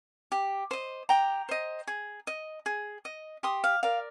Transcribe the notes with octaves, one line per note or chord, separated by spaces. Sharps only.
G4
C5 D#5
G4 G5 A#5
C5 D#5
G#4
D#5
G#4
D#5
G4 C6 D#6
F5
A#4 D5 F5